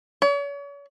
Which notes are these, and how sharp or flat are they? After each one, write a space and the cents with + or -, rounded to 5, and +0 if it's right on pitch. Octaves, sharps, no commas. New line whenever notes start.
C#5 +40